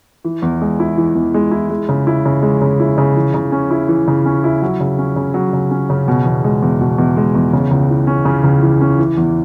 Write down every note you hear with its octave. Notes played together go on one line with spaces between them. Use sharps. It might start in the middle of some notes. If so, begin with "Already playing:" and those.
E3
E2
G#3
E4
E3
E2
G#3
E4
G#3
C#3
E4
C#3
G#3
C#3
E4
C#3
E3
C#3
C#4
E4
E3
C#3
C#4
E4
F#3
C#3
C#4
C#3
F#3
C#3
C#4
C#3
B2
E2
G#3
E2
B2
E2
G#3
E2
C#3
C#2
E3
C#4
C#3
C#2
E3
C#4
E3
E2